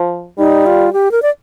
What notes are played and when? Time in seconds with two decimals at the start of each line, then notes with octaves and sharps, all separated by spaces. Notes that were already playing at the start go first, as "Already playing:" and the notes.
Already playing: F3
0.38 G3 D#4
0.66 F4
0.93 G4
1.11 A#4
1.22 D5